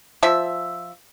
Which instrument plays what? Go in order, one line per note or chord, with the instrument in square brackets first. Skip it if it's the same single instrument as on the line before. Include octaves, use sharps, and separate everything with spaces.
[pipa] F3 E5